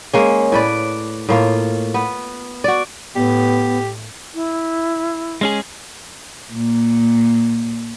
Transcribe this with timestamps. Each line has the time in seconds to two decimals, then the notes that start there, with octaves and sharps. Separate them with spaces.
0.13 G#3 A#3 C#4
0.52 A2 B4 D5
1.29 A2 A#3 F4
1.94 B3
2.64 F#4 D5
3.16 A2 B3 G4
4.35 E4
5.41 G#3 C#4 G#4
6.53 A#2